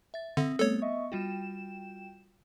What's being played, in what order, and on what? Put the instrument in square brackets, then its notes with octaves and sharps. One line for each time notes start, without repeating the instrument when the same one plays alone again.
[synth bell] E5 A6
[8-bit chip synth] D3 [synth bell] C4 [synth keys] E5 D#6
[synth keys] G3 A3 C4 [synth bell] B3 [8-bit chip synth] A4 C#5
[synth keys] D#5 E5 C#6
[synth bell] G3 F4 F#4 [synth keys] G5 E7